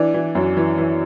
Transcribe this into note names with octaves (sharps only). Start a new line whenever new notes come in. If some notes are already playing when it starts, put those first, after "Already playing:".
Already playing: E3 D4
E3
F#2
E3
E3